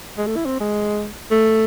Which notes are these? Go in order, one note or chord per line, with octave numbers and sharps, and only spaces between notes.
G#3
A3
E4
C4
G#3
A3